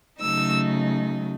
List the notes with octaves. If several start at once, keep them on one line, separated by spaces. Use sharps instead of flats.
C#3 F#3 A3 D#4 E6